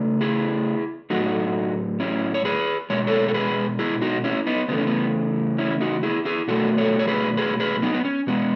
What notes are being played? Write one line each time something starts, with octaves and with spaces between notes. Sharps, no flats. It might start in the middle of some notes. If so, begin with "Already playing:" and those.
Already playing: C#3 A3
E4 G#4
A2 F#3 A3 D#4 F#4
C#4 E4
C#5
G#4 B4
B2 G#3 C#5
A4 C#5
A4
G#4 B4
E4 G#4
D#4 F#4
C#4 E4
B3 D#4
C#3 E3 A3 B3
C#4
B3
C#4 E4
D#4 F#4
E4 G#4
E4 G#4
B2 F#3 A3 F#4 A4
A4 C#5
C#5
G#4 B4
G#4 B4
G#4 B4
B3 D#4
B3
C#4
B2 G#3 B3